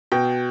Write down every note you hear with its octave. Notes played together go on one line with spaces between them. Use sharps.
B2 G5